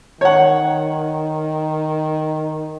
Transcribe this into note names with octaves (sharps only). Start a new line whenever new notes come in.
D#3 C#5 F#5